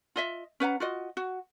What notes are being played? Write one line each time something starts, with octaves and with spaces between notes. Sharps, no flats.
F4 D#5 E5
C#4 B4 F#5 A#5
F4 F#4 D#5
F#4